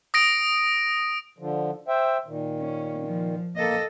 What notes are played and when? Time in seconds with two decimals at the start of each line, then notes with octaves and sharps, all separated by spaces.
0.14 D#6 A#6 D7
1.39 D3 F3
1.88 C5 E5 G5
2.26 A#2 D#3
2.60 C#4
3.06 F3
3.56 A#3 A4 D#5